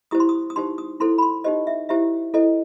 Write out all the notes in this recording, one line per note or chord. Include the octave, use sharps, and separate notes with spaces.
E4 G4 C5 D#6
C6
D#6
D#6
D#4 G4 C5 C6
D#6
E4 A4 C5 C6
B5
C6
D#4 G4 C5 D#5
E5
E4 G4 C5 E5
E4 A4 C5 D#5